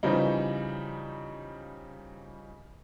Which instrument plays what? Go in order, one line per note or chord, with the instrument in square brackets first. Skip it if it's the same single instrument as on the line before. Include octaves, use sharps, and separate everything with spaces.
[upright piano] C#3 E3 F3 G3 D#4